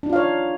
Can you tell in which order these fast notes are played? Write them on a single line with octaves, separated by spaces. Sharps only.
D4 D#4 F4 F5 C#5